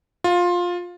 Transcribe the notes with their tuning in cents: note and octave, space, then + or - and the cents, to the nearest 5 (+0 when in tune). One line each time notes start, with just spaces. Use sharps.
F4 +15